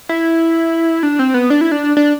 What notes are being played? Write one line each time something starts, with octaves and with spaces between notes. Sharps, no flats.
E4
D4
C4
B3
D4
E4
D4
D4